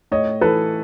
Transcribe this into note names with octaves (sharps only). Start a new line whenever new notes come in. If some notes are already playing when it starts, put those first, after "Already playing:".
A2 C#5 D#5
E3 A4 B4